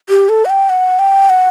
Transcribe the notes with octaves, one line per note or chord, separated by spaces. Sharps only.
G4
A4
F#5
G5
F#5
G5
F#5